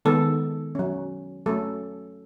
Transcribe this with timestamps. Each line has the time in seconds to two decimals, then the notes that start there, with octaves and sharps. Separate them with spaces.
0.05 D#3 G#3 B3 A4
0.75 F#3 C#4
1.46 F#3 A3 C#4 A4